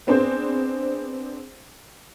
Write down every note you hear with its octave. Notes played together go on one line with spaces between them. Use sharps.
B3 C4 D4 G#4 C5